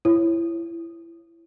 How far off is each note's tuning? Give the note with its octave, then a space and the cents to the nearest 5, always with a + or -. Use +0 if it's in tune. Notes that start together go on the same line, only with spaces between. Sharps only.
E4 +25 C#5 -20